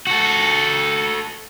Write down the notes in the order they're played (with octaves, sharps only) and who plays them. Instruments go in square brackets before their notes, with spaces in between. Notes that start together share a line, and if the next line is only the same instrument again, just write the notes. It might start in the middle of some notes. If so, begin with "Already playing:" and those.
[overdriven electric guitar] F#4 A4